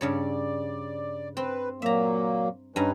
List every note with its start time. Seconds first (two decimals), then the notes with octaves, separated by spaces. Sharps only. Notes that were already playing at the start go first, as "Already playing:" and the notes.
0.01 G2 C#3 C#5 D5
1.37 C4 B4
1.82 A#2 F#3 A#3 E5 A#5
2.76 G2 C#4 D#4 B4 G#5 A#5